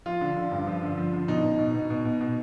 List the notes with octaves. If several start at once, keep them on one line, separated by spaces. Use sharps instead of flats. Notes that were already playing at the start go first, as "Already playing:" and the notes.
F3 F4
D3
D3
G2
F3
D3
F3
D3
B2 D#4
B2
B2
B2
B2
B2
B2